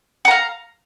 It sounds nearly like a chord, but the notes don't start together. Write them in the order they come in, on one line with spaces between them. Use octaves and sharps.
F#5 A#5 F5